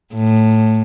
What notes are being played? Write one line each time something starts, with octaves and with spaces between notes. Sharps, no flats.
A2